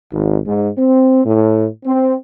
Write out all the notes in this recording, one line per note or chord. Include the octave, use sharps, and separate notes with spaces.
G#1
G#2
C4
A2
C4